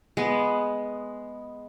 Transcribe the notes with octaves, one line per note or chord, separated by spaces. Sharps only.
G#3 B3